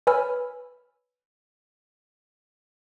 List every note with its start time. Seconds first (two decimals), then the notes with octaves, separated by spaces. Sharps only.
0.07 B4 C#5 G#5 B5 E6 F6